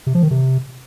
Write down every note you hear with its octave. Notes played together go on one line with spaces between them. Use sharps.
C3
F3
D#3
C3